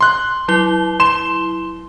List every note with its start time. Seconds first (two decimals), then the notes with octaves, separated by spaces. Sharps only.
0.01 C6 F#6
0.48 F#3 E4 G7
1.00 C6 E7